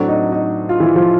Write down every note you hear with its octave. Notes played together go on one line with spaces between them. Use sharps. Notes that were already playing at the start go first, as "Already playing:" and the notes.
Already playing: A2 F#3 A3 C4 D4
D#4
D#4
F4
E3 E4
F3 F4